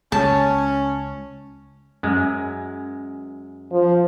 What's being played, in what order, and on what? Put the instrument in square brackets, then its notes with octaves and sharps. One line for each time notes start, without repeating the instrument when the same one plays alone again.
[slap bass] C#2 [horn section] C#4 [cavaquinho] A5
[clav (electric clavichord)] F#2 G#3
[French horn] F3